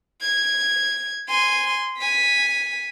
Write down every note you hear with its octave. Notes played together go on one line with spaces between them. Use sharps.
G#6
G#5 C6
G#5 B6